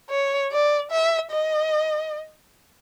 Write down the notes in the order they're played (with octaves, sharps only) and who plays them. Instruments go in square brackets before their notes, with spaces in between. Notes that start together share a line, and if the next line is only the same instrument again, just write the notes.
[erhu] C#5
D5
E5
D#5